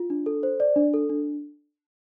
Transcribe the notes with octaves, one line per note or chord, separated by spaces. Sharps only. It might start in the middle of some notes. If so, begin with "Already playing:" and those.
Already playing: F4
D4
A4
C5
D5
D4
A4
D4